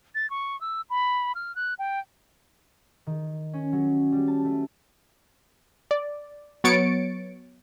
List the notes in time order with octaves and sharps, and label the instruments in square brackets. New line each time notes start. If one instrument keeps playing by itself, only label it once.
[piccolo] A6
C#6
E6
B5
F6
F#6
G5
[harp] D#3
C#4
F#3
G3
A5
A3
[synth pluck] D5
F#3 B3 C#5 A6 C#7 D7